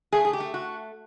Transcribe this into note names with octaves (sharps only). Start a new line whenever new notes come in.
A3 G#4
G#4
G4
A3
F#4